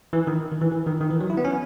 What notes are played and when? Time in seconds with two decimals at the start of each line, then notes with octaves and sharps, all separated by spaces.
0.13 E3
0.27 D#3
0.52 D#3
0.62 E3
0.72 E3
0.86 D#3
1.01 D#3
1.11 E3
1.20 F#3
1.30 E4
1.37 B3
1.45 C#4